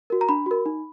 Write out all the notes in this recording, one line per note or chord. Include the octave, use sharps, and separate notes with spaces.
F#4 A#4
A#5
D4 B5
F#4 A#4
D#4